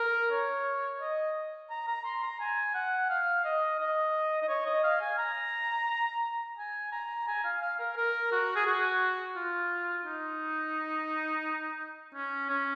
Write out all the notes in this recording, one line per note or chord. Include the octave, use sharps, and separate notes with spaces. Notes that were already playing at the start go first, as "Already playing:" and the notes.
Already playing: A#4
C#5
D#5
A#5
A#5
C6
A#5
G#5
F#5
F5
D#5
D#5
D#5
C#5
D#5
F5
G#5
A#5
G#5
A#5
G#5
F5
F5
A#4
A#4
F#4
G#4
F#4
F4
D#4
C#4
C#4